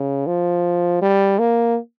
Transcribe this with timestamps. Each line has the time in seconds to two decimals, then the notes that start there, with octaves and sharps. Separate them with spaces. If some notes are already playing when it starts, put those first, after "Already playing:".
Already playing: C#3
0.27 F3
1.02 G3
1.39 A#3